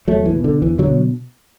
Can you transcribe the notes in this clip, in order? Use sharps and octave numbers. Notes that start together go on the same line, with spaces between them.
E2 F#3 A3
E3
B2
D3
E2 E3
D3 F#3
B2